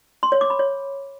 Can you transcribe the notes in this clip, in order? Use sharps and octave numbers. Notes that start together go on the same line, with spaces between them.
C6
C#5
D6
B5
C#5